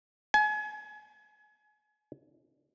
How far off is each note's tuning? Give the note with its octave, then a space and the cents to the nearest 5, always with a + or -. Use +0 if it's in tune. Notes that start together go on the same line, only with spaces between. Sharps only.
G#5 +30